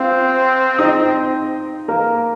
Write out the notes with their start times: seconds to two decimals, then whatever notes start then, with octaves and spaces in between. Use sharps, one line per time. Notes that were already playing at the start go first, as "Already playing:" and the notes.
Already playing: C4 F4 F5
0.79 D#4 D#5
1.88 A#3 A#4